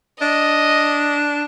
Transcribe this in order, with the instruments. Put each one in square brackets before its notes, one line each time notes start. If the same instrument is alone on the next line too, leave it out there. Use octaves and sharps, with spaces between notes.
[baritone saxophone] D4 [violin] D#5